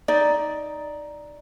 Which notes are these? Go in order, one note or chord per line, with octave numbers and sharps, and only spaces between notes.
D#4 D5